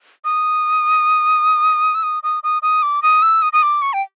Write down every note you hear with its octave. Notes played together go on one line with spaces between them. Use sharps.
D#6
E6
D#6
D#6
D#6
D#6
D6
D#6
E6
D#6
D#6
D6
C#6
G5